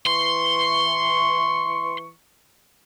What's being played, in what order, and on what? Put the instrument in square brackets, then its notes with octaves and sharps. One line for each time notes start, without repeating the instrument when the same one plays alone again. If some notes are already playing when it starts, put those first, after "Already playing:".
[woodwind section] E3 C#6 [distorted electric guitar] C6